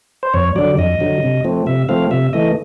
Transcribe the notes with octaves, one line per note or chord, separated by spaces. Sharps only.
C5
F2 C#5
D3 F#3 D5
F2 D#5
D3 F#3
C3
F3 A3 C4
C3 E5
F3 A3 C4 F5
C3 E5
E3 A3 D#5